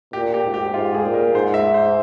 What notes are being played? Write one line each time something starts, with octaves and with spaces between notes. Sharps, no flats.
A#2 G4
G4
G#2
G4
G#2 F4
G#4
A#2
A#4
G#2 C5
E5
C5